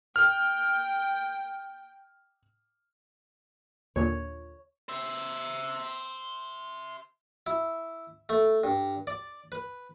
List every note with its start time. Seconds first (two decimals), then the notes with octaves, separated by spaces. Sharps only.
0.16 G5 F6
3.96 D#2 A#2 D3 C#5
4.89 C5 E5
7.47 E4
8.29 A3
8.64 G2
9.07 D5
9.52 B4